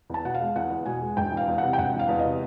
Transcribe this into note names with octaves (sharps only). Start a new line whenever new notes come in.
E2 A5
B2 F#5
F5
G#3
E2 F#5
E2
B2 G#5
G#3
E1 G5
E3
F5
E2
C3 F#5
G5
E1 F#5
E3
F5
E2
D#5
C3